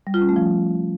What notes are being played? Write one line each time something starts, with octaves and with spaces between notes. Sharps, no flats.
G3
F4
C#4
A3
F3